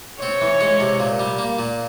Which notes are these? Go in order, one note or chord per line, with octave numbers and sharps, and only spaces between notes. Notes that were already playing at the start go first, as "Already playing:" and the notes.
C4 C#5
E3
G#3
C3
A#2
G3
A#3
A#2